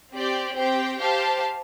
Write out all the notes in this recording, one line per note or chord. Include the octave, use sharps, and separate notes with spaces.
C4 G4 D5
C4 G4 C5 G5
G4 C5 F5 A5